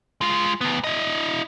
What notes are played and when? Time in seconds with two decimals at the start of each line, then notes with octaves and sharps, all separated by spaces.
0.21 G#3 F4
0.61 D2 B3
0.84 E4 D#5